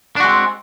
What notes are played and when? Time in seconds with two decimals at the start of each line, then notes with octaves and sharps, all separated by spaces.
0.16 D4
0.20 F#4
0.24 G#3
0.28 C4